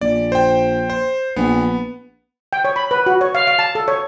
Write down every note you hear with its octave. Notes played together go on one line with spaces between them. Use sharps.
A#1 D5
C5 G5
C5
A#1 B3
G5
C#5
B5
B4
F#4
C#5
F5
F5
A5
A4
C#5